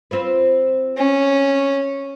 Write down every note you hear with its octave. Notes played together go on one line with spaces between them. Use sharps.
C4 F4 B4
C#4